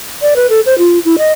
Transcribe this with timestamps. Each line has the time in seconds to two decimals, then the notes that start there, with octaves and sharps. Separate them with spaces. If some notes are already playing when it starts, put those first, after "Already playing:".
0.22 D5
0.36 B4
0.50 A4
0.66 C5
0.78 F4
1.05 E4
1.18 D#5